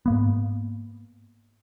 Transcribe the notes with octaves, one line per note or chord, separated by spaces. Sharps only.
G#2 A#3 B3